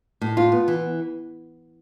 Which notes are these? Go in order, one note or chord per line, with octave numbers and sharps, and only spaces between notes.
A2
F4
B3
E3